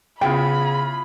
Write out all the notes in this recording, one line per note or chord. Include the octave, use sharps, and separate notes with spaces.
C#3 B3 E4 F4 G5 B5